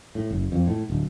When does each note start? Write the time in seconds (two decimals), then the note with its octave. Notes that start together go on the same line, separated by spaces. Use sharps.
0.15 A2
0.31 F#1
0.52 F2
0.67 A2
0.90 D1